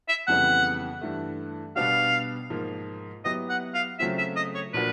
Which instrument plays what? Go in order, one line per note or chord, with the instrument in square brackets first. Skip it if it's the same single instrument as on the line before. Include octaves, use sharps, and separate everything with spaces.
[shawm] E5
[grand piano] F2 C#3 E3 G3 B3 [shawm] F#5
[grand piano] G2 E3 A3
[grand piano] B2 G3 B3 D4 F#4 [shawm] F5
[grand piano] G#2 F3 A#3
[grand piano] F#3 B3 E4 G4 [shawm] D#5
[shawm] F#5
F5
[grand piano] C#3 F#3 A3 C4 F4 [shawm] E5
[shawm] E5
D#5
C#5
[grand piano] A#2 F3 A#3 D4 F#4 [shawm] B4